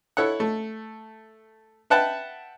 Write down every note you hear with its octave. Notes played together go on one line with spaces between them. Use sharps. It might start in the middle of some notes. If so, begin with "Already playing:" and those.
E4 A4 C#5 F#5
A3
B4 E5 F#5 G5 A5